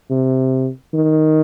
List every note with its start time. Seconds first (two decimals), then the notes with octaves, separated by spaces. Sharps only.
0.10 C3
0.93 D#3